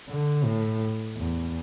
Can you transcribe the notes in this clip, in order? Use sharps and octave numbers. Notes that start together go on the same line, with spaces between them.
D3
A2
E2